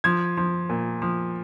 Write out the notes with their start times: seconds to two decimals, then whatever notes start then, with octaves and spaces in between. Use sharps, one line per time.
0.04 F3 G#6
0.37 F3
0.69 A#2
1.02 F3